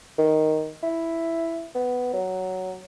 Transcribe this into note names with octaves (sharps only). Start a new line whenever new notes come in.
D#3
E4
B3
F#3